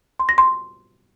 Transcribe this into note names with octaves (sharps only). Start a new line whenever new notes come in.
C6
A#6
C6